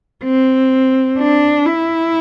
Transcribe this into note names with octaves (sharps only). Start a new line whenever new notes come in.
C4
D4
E4